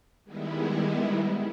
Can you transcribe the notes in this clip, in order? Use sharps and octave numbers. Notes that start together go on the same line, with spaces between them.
D#3 G3 G#3 B3 E4